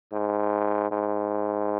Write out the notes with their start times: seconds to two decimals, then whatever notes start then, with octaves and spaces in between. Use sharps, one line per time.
0.13 G#2
0.91 G#2